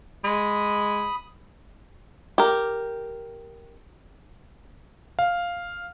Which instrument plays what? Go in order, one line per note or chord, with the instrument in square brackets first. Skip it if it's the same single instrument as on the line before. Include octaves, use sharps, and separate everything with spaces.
[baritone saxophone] G#3 [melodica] B5 D#6
[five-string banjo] G4 A#4
[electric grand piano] F5